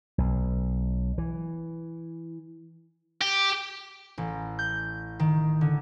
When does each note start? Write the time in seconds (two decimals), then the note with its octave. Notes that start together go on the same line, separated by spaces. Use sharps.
0.18 B1
1.18 E3
3.21 G4
4.18 A1
4.59 G6
5.19 D#3
5.61 D3